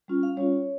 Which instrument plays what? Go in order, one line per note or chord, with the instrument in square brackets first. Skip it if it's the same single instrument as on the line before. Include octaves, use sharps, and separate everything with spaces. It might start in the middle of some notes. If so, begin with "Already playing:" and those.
[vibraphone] G3 C#4 F4
F5
G3 C#4 F4 C#5